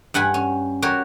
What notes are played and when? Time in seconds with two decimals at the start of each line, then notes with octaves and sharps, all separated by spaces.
0.14 G2 F#5 G#5 B5
0.34 C#4
0.82 F#4 G4 A#4 C#5